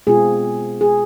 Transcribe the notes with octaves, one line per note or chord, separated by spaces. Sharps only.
B2 G#3 C4 F4 G#4
G#4